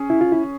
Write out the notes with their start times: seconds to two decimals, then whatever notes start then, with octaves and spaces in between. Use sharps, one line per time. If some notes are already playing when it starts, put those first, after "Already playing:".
Already playing: C#4 G#4
0.10 E4
0.21 F4
0.32 E4